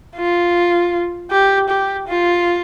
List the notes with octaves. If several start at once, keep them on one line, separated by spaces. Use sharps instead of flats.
F4
G4
G4
F4